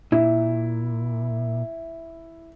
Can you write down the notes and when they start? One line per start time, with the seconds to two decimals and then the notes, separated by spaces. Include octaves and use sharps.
0.12 A#2 E4